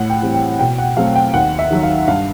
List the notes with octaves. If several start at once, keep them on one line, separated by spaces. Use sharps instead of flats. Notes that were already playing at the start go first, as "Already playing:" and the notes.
Already playing: A2 F#5
G5
E3 G3 C4
G5
B2 G5
F#5
F#3 A3 C4 F5
G5
D#2 F#5
E5
D#3 F#3
F5
G2 F5